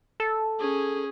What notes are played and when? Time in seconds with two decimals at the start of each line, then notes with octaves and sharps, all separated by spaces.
0.20 A4
0.59 C#4 G#4